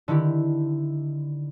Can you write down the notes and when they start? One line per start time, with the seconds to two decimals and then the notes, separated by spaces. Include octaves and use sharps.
0.08 D3 D#3 E4 G4